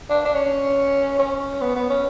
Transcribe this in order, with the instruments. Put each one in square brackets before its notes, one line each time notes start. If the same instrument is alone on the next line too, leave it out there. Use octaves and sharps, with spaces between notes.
[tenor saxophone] D4
D4
C#4
C#4
B3
B3
C#4